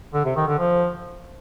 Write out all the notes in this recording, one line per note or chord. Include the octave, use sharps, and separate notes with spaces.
D3
C3
D#3
D3
F3